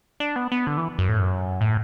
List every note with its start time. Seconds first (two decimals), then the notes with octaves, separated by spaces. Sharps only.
0.20 D4
0.36 B3
0.52 B3
0.67 D3
0.77 E3
0.99 F#2
1.09 A2
1.19 F#2
1.61 A2